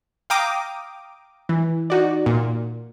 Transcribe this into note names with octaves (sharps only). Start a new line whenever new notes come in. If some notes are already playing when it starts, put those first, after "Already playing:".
F5 G5 A#5 D6 D#6
E3
D#4 F#4 D5
A#2